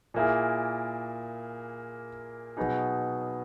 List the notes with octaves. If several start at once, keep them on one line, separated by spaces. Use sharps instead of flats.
A#2 A#3 E4 G#4
B2 F#3 B3 D#4 G#4